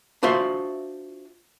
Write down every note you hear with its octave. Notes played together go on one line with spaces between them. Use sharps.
D4 F4 F#4 C5 E5